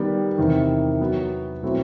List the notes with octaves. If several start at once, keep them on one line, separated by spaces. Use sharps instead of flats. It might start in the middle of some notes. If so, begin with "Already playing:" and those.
Already playing: D#3 G3 B3
E2 C3 D#3
F#3 B3 F#4
B2 F#3 A3 C4 E4